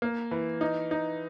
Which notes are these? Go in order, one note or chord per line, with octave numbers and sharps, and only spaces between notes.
A#3
E3
D#4
D#4